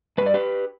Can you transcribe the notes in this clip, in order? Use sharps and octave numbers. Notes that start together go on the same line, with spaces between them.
G2 G3 B4 D5
G4 B4